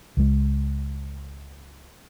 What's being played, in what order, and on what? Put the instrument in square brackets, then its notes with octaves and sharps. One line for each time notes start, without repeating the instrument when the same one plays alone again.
[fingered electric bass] C#2 G#3